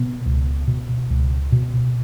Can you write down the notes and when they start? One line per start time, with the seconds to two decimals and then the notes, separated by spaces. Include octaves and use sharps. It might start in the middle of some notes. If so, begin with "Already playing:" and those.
Already playing: B2 B3
0.26 C#2
0.68 B2
1.10 C#2
1.52 B2